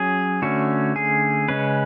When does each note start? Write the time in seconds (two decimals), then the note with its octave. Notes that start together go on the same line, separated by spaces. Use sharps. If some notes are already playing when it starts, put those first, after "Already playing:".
Already playing: F#3 C#4 G#4
0.42 D3 A3 C#4 F#4
0.96 G#4
1.48 C#3 G#3 C#4 B4